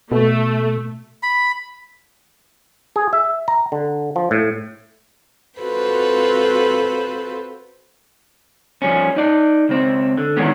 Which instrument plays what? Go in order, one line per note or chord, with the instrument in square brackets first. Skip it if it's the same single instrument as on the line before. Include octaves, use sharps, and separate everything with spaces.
[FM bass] B2 [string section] A3
[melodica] B5
[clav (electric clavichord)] G#4
E5
A#5
D3
F3
A2
[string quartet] C4 F4 F#4 A4 B4 C5
[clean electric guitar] F3 G3 C#4
D#4 D5
C#2 C4
D3
D#3 E3 G3 G#3 B3 C#4